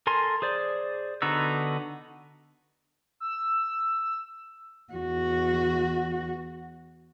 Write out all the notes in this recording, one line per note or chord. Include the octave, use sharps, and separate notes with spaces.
A4 A#4 G#5 C6
G#4 C5 D5
D3 B3 D#4 F#4 E6
E6
E2 F#4